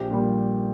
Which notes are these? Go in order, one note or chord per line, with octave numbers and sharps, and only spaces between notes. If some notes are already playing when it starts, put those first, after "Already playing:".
Already playing: A#1 G4
A#2 G3